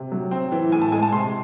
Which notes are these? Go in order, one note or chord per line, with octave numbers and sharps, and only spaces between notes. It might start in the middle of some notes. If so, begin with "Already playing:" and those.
Already playing: C3
F#3
C4
E3
A2 G#5
A5
G#3 G#5
A5
C3 C6